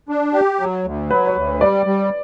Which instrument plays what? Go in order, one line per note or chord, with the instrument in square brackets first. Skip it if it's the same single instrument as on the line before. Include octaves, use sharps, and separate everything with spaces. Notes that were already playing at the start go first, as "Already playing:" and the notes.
[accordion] D4
G4
F#3
D2
[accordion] F#3 [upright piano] B4
[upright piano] C#5
[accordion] D2
[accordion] G3 [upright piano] D5
[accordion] G3